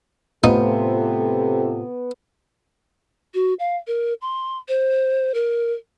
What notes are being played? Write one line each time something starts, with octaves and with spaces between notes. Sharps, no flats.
A2 C3 B3 D#4 F4 A4 C5
F#4
F5
A#4
C6
C5
A#4